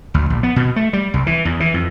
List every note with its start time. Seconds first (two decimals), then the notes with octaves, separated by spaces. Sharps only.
0.14 D2
0.30 A#1
0.43 B3
0.56 B2
0.76 A3
0.93 G3
1.14 C2
1.27 E3
1.45 E2
1.60 E3
1.74 F2